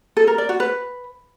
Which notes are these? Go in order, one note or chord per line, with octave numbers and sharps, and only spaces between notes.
A4
A#4
D5
F#4
B4